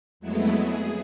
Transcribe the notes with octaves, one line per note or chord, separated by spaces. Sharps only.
F2 F#3 G#3 A3 B3 E4
G#4